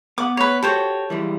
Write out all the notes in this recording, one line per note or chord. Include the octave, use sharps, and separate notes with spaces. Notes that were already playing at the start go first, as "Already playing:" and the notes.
B3 F#5 D6
B4 C#5
F#4 G4 A4 C5 C#5
E3 G3 G#3